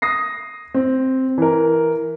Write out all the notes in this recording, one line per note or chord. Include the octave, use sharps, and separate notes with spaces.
D#6 A#6 C7
C4
E3 A#4